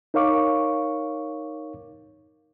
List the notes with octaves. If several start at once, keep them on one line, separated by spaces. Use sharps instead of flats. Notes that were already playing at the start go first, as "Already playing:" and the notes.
D#4 A#4 C#5 F5 C#6 D6